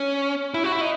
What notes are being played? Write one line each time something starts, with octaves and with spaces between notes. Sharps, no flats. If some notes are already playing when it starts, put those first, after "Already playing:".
Already playing: C#4
E4
F#4
E4
D#4